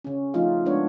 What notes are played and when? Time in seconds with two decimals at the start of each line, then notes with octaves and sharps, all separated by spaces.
0.04 C#3 C#4
0.34 F3 A3 D#4 F4 F5
0.66 G#3 B3 D4 C#5